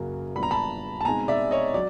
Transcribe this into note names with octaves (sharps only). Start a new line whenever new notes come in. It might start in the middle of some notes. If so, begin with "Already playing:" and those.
Already playing: F#2 C#3 F#3 A#3
A#2 G3 B3 D4 B5
A#5
A5 B5
A5
B2 G#3 C4 D#4 G#5 A#5
D5 E5
C#5 D#5
F#3 D5